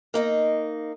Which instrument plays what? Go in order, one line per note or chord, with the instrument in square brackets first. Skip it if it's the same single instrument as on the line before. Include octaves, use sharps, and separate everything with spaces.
[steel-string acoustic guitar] A#3 D#4 D#5